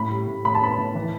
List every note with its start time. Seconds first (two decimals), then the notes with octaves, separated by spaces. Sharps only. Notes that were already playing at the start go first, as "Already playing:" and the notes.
Already playing: A2 B5
0.10 G3
0.27 A2
0.45 A2 B5
0.55 A5
0.62 B3 B5
0.78 A2
0.95 E3